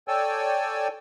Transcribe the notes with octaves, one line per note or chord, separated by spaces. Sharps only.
A4 C#5 D5 G5 G#5 E6